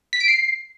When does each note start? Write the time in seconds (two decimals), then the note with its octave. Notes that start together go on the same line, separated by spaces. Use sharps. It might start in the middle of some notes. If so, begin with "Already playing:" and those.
0.13 B6
0.20 D7
0.28 C7